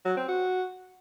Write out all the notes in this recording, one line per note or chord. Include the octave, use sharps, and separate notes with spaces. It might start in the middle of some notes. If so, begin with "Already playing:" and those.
F#3
C4
F#4